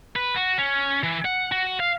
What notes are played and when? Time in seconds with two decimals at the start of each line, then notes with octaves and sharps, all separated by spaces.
0.16 B4
0.36 F#4
0.58 C#4
1.04 E3
1.25 F#5
1.52 F#4
1.80 F5